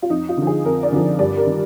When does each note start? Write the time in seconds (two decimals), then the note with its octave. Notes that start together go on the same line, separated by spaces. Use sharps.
0.02 F4
0.10 F2 D#4
0.29 F4
0.37 D3 F3
0.47 G#4
0.65 F2 A#4
0.83 D5
0.92 D3 F3
1.19 G2 D5
1.37 A#4
1.47 D#3